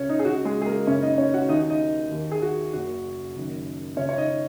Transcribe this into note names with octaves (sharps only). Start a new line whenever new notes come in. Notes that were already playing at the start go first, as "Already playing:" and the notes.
Already playing: C#2 C#3 C#4 C#5
D#4
G#4
C#2 C#3 F#4
G#3 G#4
G#4
A#3 A#4
F#1 F#2 C#3 C#4 C#5
D#4 D#5
C#4 C#5
F#4 F#5
D#2 D#3 D#4 D#5
D#4 D#5
D#2 D#3
G#4
F#4
F#1 F#2 C#3 F#4
F#1 F#2 D#3
C#2 C#3 C#4 C#5
C#5
D#4 D#5